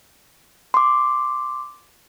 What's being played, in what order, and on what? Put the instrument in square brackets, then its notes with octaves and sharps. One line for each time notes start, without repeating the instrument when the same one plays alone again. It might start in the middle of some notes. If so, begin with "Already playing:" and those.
[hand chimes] C6 D6